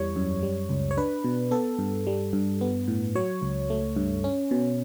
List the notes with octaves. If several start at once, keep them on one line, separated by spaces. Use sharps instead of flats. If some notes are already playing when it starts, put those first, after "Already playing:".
Already playing: E2 E3 G3 C#5
F#2
G3
C#2
C#5
D4 B4
B2
B3 A4
G2
G3
G2
B3
A2
F#3 C#5
C#2
A3
G2
C#4
B2